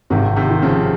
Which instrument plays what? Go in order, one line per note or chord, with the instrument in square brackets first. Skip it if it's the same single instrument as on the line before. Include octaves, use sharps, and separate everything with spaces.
[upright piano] G#1 [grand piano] C3 D#3
[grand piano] C3 D#3
[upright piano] D#3
[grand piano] C#3 F3